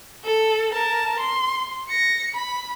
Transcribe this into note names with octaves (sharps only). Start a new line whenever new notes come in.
A4
A#4 A5
C6
A#6 C#7
B5